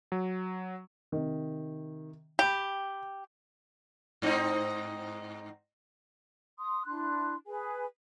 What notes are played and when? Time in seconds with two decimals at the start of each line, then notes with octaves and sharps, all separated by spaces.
0.12 F#3
1.12 C3 D#3
2.39 G4 G5 B5
4.22 G#2 C4 D#4
6.59 C6 D#6
6.86 D4 E4 C6 F#6
7.47 G#4 B4 G#5